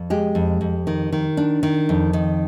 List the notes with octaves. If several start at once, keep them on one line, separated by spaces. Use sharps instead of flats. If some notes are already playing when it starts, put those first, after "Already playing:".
Already playing: F2
G#3 G4
F2
F2
D#3
D#3
D4
D#3
F2
D#3